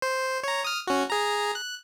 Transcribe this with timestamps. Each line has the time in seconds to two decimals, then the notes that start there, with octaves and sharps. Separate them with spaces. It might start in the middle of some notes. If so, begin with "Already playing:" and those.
0.02 C5
0.43 C#5 A#5
0.64 D#6 F6
0.87 C#4 F#4
1.10 G#4 A#5
1.55 F#6